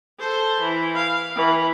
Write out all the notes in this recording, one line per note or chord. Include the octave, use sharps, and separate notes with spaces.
A4 C5
E3
F5
E3